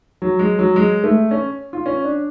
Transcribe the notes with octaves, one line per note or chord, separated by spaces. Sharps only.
F#3
G#3
F#3
G#3
A3
C#4
F4
C#4
D4